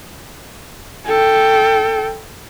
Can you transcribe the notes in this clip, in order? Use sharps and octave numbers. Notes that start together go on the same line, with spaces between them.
A4 G5